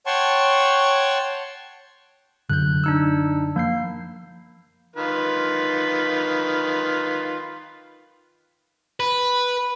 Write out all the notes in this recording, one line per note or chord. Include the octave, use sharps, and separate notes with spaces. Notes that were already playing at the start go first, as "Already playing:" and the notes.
C#5 F#5 G5 A5 C6 C#6
F#2 D3 F#6 G6
D4 D#4 E6
F3 A#3 G6 C7
D#3 F4 B4
B4